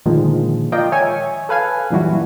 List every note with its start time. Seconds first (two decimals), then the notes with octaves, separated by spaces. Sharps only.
0.06 A#2 D3 D#3 F3 G#3
0.72 F4 A#4 D5 D#5 G5
0.92 C#5 E5 G#5 C#6
1.49 A4 B4 F5 G#5
1.90 F#2 A#2 E3 G3 E4 F#4